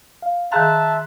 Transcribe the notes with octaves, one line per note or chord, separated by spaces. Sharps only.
F5
D#3 G#4 E5 F5 A5 A#5 C6 F#6